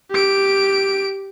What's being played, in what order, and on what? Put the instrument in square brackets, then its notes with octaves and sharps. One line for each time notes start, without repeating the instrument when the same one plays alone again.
[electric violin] G4 D7